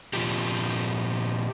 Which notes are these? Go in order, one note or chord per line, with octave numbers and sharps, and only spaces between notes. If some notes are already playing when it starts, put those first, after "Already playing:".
A#2 F3 C4 F4 G4